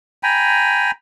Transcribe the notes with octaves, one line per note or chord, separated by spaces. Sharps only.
G5 G#5 A#5 B5